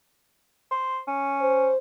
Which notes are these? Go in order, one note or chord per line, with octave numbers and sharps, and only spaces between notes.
C5
C#4
C5